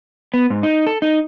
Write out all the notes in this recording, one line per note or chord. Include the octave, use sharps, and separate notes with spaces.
B3
G#2
D#4
A4
D#4